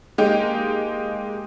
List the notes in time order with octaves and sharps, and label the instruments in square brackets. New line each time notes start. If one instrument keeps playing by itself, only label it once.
[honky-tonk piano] G#3 A#3 D#4 G4